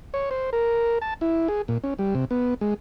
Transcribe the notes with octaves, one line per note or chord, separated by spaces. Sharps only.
C#5
C5
A#4
A5
E4
G#4
A#2
C#4
G3
C3
B3
G#3